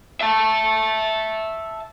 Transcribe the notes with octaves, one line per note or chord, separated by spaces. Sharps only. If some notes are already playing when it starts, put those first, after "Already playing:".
E5 A5